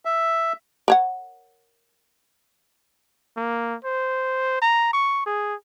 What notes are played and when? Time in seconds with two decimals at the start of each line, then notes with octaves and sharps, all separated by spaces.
0.05 E5
0.88 A#4 C#5 F#5
3.37 A#3
3.85 C5
4.62 A#5
4.93 C#6
5.26 G#4